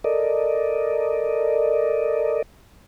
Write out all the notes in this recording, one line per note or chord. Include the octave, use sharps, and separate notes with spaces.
A4 A#4 D5 D#5